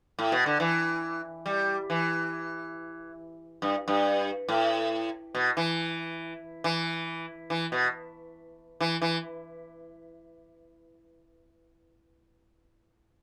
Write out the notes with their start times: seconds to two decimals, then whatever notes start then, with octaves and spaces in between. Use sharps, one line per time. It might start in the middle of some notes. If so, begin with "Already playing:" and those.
0.19 A2
0.32 B2
0.46 D3
0.60 E3
1.46 G3
1.90 E3
3.62 G2
3.88 G2
4.49 A2
5.35 B2
5.57 E3
6.64 E3
7.50 E3
7.72 B2
8.81 E3
9.02 E3